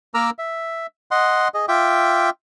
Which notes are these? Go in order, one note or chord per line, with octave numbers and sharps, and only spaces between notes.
A#3 A#4 A#5 D6 E6 F6
E5
D#5 F#5 C6
G#4 D#5
F4 E5 G5 D6